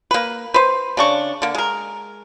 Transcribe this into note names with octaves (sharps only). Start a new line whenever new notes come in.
A#3 B4
B4 C5
C#3 D4 C#6
D3 A#3
G#3 A#4